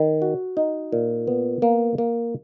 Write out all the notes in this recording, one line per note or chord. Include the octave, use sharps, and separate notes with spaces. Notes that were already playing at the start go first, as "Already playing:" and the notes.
Already playing: D#3
F#4
D#4
A#2
B3
A#3
A#3